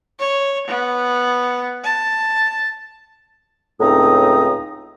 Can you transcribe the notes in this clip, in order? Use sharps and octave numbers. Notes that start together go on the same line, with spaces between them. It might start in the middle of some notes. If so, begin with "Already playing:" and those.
C#5
B3
A5
C#2 A2 C4 D#4 A#5 D#6